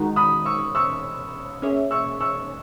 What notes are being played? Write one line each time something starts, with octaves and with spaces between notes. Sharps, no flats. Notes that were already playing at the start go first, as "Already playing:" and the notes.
Already playing: D#3 G#3 D#4 F#4
B5 D#6
C#6 E6
C#6 E6
A#3 C#4 G#4 C#5 E5
C#6 E6
C#6 E6